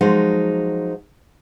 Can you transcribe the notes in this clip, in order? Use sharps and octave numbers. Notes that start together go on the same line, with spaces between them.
F3 F#3 G#3 D#4 F#5